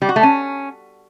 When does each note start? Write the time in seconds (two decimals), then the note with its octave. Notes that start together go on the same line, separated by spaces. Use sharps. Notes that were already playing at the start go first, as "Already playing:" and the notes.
0.02 G3
0.09 F#4
0.16 A3
0.23 C#4